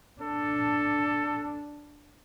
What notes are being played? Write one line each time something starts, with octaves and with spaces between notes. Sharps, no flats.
D4 A4